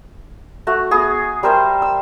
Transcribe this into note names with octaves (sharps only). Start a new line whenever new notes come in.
A3 F#4
B3 G#4 D#6
G3 A#4 C5 E5
E6